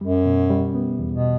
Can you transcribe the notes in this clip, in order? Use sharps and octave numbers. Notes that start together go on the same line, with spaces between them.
F#2 G3
B2
G3
B3
E2
B2